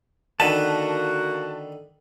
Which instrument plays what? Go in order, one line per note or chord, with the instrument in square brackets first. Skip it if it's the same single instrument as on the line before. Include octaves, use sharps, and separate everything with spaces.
[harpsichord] D3 D#3 B4 [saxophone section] A#3 F#4 [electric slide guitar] A5